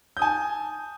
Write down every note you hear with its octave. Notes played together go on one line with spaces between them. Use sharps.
G#5 A5 D#6 G6